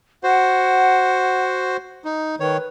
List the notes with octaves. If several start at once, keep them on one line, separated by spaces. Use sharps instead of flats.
F#4 C5 F#5
D#4
D#3 B4 C#5